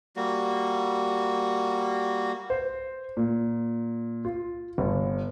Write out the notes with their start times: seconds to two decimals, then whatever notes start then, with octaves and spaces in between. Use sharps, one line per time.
0.16 G3 A#3 F#4
2.50 C5
3.17 A#2
4.25 F4
4.78 G1